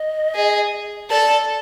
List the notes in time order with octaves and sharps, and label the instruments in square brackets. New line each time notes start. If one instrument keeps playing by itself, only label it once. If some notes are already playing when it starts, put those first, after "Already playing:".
Already playing: [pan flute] D#5
[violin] G#4
[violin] A4 [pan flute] D5